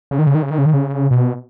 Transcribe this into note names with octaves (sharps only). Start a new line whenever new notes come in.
C#3
D#3
C#3
D#3
C#3
D#3
C#3
D#3
C#3
B2